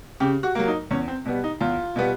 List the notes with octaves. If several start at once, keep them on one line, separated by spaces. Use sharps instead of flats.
C#3 G4
F#4
F#3 A#3
D#4
E2 C#4
C4
B2 G3 B3
D#4
E2 F4
B2 G3 B3